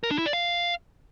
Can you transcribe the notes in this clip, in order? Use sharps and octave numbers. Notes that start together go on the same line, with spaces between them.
A#4
D4
E4
D5
F5